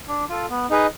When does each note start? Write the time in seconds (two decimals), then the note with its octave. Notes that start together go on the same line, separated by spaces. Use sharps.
0.08 D4
0.29 F4 A4
0.50 B3
0.70 D#4 G#4 B4 D#5